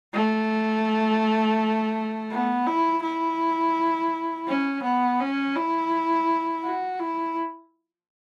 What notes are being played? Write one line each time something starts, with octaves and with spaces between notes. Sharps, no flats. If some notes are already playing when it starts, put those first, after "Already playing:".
A3
B3
E4
E4
C#4
B3
C#4
E4
F#4
E4